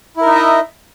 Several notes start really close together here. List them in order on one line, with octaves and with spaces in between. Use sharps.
E4 A#4 D#4 E5 D#5